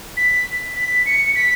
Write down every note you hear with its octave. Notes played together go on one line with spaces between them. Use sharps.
B6
B6
C#7
B6